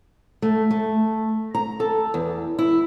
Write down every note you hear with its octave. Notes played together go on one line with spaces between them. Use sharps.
A3
A3
A#5
A4
E2
E4